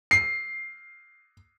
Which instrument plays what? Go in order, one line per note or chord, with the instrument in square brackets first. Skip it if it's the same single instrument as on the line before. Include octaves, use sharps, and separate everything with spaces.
[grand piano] C7